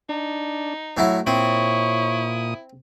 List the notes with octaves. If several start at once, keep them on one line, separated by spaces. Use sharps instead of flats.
D4 D#4
A2 F#3 E4 C#5
A#2 C4 E4 C#5 D#6